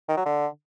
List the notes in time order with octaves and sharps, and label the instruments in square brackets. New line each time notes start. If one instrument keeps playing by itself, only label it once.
[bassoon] D#3
F#3
D3